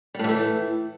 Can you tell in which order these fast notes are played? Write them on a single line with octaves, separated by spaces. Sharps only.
G3 A2 E3 A3